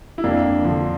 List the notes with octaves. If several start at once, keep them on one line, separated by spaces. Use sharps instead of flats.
E4
F2 A#3 D4
D3 F3